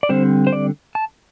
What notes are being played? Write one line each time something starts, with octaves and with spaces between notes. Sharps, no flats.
D5
D3 G3 C4 C5
C5
D5
A5